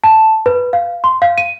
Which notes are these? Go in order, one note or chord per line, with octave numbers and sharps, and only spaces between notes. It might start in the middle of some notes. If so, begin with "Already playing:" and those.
A5
B4
F5
C6
F5
D#7